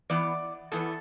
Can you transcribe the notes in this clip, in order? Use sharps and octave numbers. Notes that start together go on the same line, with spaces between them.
E2 E3 B3 D5
E2 E3 B3 A4